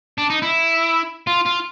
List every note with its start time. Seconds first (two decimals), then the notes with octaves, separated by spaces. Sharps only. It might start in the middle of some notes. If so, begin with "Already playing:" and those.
0.18 D4
0.30 D#4
0.42 E4
1.27 F4
1.46 F4